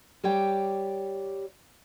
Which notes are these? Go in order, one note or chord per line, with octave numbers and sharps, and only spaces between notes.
G3 G4 C#5 G5